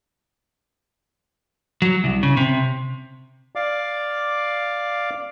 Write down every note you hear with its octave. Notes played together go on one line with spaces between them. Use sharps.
F#3
C2
C#3
C3
D5 F5 D6